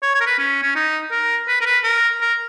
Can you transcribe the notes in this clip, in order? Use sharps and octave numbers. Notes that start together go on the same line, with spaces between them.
C#5
C#5
A#4
B4
C#4
C#4
D#4
A#4
B4
A#4
B4
A#4
A#4